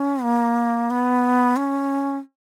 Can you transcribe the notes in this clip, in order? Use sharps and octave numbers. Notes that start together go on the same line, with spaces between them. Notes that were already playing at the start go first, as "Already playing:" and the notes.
Already playing: C#4
A#3
B3
C#4